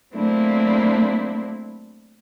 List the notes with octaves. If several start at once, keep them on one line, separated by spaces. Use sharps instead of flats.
F#3 A3 A#3 C4 D4 E4